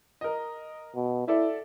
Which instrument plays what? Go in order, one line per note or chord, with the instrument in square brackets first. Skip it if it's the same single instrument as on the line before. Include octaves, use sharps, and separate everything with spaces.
[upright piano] A#4 D#5
[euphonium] B2
[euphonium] E4 [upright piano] A4 D5 E5